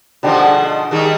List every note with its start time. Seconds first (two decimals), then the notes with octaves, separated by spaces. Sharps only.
0.23 B2 D3 F3 G3 D4 G4
0.40 G#4 A4
0.63 D#5
0.91 D#3 G3 G#3